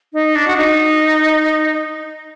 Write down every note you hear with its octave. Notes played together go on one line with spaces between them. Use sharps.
D#4
D4
F#4
D#4